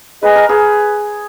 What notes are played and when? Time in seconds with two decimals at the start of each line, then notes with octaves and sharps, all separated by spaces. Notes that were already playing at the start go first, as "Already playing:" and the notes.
0.22 G#4 B4 D#5 G#5
0.36 A#4
0.49 G#4 B4